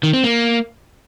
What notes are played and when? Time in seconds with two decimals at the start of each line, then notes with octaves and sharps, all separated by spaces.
0.03 D#3
0.13 C4
0.24 A#3